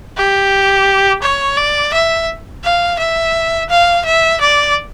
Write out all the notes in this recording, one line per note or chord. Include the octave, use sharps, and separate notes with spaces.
G4
C#5
D5
E5
F5
E5
F5
E5
D5